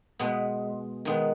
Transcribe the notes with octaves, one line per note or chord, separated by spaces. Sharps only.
B2 G#3 B3
D#3 G#3 B3